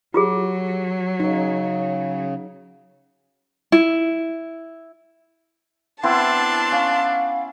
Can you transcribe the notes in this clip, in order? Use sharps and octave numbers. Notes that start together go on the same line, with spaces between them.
F#3 F4 G4 G#4
C#3 D#4 C#5
E4
B3 C4 D4 E4 A5 C6
C#4 F5